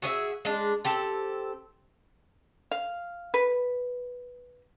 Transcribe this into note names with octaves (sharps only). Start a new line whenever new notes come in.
F#4 G#4 C#5 E5
G#3 D4
C4 G4 A4
F5
B4